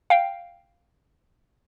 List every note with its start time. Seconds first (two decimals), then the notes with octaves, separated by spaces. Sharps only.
0.10 F5 G5